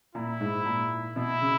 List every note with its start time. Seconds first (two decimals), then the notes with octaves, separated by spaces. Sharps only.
0.15 A#2 E4
0.41 G#2
0.65 A#2
1.16 B2 E4
1.41 C#3